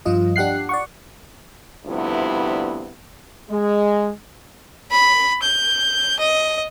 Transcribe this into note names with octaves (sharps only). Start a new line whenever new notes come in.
G2 F3 F4 D#5
D4 G4 F#5 F#6 C7
D5 F#5 C#6
D2 G2 C3 F3 B3 E4
G#3
B5
G6
D#5